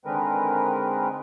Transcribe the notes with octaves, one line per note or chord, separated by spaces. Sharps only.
D3 D#3 G#3 C4 A#4 B4